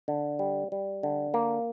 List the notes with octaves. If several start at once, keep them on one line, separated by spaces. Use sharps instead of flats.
D3
G3
G3
D3
A#3